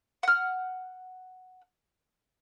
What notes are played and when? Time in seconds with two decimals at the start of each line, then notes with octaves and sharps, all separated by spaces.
0.23 F#5 F6